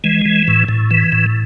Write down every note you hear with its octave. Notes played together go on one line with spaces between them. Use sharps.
E3 G#3
E3
A2
A2
E3
A2